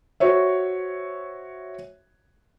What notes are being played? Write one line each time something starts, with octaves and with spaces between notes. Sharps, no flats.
F#4 C5 C#5 E5